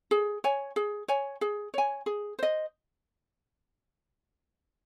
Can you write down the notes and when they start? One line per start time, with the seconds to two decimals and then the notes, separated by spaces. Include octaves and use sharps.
0.11 G#4
0.44 C#5 G#5
0.76 G#4
1.08 C#5 G#5
1.41 G#4
1.74 C#5 G#5
2.06 G#4
2.39 C5 D#5